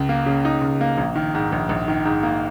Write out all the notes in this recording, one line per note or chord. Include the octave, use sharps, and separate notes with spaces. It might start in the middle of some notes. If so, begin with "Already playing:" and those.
Already playing: C#2
A#3
C#3
D#4
C#2
A#3
A#1
D#3
G#2
A#1
A#1
D#3
G#2
A#3